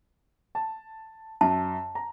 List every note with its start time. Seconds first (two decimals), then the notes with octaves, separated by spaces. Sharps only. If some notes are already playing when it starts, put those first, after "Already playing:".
0.55 A5
1.41 F#2 A5
1.95 A#5